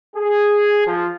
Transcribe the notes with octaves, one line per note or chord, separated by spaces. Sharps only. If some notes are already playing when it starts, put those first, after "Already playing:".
G#4
F3